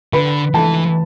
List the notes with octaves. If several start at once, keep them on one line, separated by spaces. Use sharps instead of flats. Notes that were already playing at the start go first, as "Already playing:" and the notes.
D3 B4 B5
E3 A4 A5